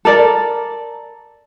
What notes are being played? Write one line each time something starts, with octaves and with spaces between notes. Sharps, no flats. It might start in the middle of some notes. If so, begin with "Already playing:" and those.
A4 A#4 D5